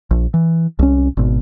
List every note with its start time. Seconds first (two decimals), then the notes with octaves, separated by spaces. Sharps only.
0.11 A#1
0.34 E3
0.79 C2 C#4
1.17 G#1 B2